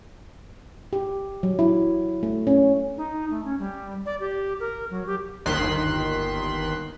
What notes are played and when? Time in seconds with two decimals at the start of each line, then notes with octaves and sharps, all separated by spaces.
0.93 G4
1.43 F#3
1.59 E4
2.23 A3
2.47 C#4
2.97 D#4
3.30 A3
3.45 C#4
3.59 G3
4.06 D5
4.20 G4
4.60 A#4
4.91 F#3
5.07 G4
5.46 G1 D#2 D#3 C6 F#6 B6